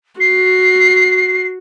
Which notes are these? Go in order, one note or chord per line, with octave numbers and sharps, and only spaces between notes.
F#4 C7